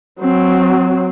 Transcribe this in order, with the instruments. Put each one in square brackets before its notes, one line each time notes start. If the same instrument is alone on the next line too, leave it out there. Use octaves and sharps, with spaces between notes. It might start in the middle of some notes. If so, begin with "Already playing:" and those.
[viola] F#3 C4